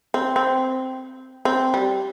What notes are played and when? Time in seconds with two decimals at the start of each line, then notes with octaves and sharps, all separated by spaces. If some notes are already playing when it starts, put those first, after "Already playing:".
0.14 C4
0.36 C4
1.45 C4
1.74 G3